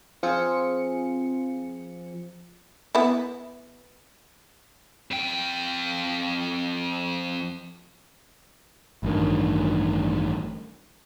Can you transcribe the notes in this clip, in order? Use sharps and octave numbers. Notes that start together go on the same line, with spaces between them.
F3 C4 F4 G#4 C#7
B3 E4
F2 G5
A1 G2 D#3